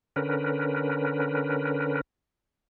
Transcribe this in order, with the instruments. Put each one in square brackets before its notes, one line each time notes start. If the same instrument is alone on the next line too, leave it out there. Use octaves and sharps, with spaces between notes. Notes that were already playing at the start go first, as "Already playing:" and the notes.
[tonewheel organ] D3 C#4 A#4 B4